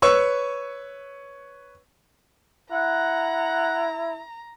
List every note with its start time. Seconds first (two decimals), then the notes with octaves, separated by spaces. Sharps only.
0.02 B4 C#5 C#6 E6
2.72 E4 F#5 A#5